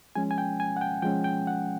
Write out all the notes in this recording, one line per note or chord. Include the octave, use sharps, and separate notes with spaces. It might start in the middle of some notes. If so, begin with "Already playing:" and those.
F3 G#3 C#4 G#5
G#5
G5
G#5
F#5
G5
F3 G#3 C#4 G5
G5
F#5